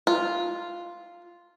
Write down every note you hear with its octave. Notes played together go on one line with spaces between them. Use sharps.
F4